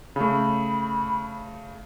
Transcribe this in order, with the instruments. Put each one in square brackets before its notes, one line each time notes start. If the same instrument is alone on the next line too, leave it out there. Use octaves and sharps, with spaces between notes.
[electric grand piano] C#3 A3 [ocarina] B5